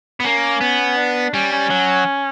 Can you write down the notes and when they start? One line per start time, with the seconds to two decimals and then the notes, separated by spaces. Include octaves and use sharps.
0.20 B3
0.24 A#3 C#4
0.61 B3
0.97 D4
1.34 G3 C#4
1.52 C#4
1.70 F#3